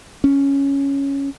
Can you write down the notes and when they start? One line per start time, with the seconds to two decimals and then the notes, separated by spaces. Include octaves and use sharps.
0.24 C#4